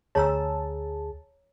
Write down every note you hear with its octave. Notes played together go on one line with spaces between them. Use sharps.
D2 G#4 C#5 A5 A#5 E6